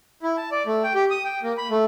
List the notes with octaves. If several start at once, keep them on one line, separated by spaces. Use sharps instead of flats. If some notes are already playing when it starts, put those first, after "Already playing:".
E4
A5
D5
A3
G5
G4
D#6
G5
A#3
B5
A3